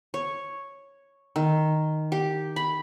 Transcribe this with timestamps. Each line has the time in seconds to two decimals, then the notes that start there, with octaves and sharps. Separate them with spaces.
0.14 C#5
1.36 D#3
2.12 G4
2.56 B5